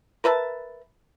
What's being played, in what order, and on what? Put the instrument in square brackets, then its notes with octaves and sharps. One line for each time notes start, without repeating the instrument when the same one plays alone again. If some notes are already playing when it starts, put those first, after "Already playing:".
[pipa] A#4 B4 E5 A5